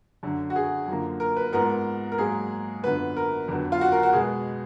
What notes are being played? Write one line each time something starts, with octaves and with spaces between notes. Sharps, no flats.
F#2 D3 F#3
F#4
G#4
F#2 D3 F3 A#3
A#4
B4
G#2 F3 B3 A#4
A#4
G#2 F#3 A#3 G#4
F#2 D3 F3 B3 B4
A#4
F2 D3 F#3 B3
F4
F#4
A#4
F#4
B2 G#3 B3 G#4